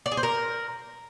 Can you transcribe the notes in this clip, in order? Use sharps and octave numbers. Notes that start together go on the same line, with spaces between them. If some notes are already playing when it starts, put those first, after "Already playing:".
D5
G#4
C5
A#4